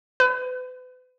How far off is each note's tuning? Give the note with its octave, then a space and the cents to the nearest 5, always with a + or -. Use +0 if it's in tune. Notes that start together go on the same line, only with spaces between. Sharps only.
B4 +40